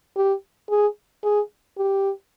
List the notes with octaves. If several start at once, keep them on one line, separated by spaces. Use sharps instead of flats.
G4
G#4
G#4
G4